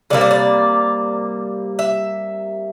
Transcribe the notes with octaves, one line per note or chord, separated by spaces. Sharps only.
C3 G3 A#3 D5
C5
D5
E5